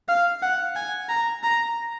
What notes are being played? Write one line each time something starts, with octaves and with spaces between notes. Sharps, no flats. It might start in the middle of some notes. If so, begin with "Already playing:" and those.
F5
F#5
G#5
A#5
A#5